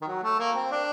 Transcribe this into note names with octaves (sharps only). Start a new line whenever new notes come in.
D#3
F#3
A3
A#3
C4
D4